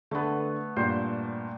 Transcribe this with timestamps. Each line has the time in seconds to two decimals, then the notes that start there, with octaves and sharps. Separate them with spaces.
0.11 D3 A3 B3
0.76 G2 A#2 C5